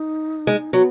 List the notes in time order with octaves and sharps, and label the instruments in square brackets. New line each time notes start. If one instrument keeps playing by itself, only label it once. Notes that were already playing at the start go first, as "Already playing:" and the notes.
Already playing: [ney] D#4
[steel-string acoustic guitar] G#3
[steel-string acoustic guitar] F#3 [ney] B3